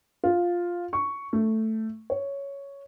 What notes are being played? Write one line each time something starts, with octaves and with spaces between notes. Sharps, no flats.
F4
C#6
A3
C#5